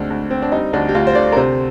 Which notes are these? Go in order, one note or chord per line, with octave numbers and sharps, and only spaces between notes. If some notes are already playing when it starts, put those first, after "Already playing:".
Already playing: D2 G#3 C4 D4
D2
C4
D4
G3 D#4
D2 D4
G4
D2 F4
C5
D3 D5
A#4
C3 C5